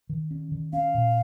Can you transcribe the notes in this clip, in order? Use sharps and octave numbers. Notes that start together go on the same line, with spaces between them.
D#3
C#4
D#3
C#4 F5
A#2